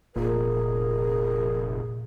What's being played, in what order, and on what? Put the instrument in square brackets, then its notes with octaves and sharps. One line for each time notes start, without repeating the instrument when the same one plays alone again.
[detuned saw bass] F1 [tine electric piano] A#2 [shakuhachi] G#4 [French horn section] A#4